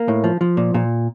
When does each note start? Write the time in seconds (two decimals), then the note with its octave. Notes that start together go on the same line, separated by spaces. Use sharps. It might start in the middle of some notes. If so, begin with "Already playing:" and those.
Already playing: A#3
0.08 A2
0.24 F3
0.41 F3
0.57 A#2
0.74 A#2